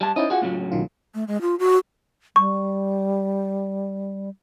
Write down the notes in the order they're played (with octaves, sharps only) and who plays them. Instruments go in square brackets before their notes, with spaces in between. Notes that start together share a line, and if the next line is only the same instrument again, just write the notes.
[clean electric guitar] G3 A5
[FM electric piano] C#4 D#4 E4 [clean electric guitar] C5 D#5
[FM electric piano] F4 [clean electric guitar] F#4 G#4 F#5
[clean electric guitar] A2 C#3 F#3
[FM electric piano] B1 D#3 F4
[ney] A3
G#3
F4
F#4
[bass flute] G3 [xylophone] C#6